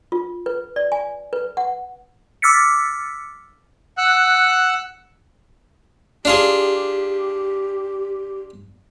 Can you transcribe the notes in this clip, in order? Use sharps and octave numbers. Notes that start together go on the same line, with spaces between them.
F4
B4
D5
G#5
B4
F#5
D6 E6 F6 A6 B6 C#7
F#5 E6 F#6
D4 F4 G4 G#4